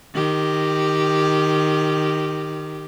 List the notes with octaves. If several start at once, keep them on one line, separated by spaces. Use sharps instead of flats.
D#3 G4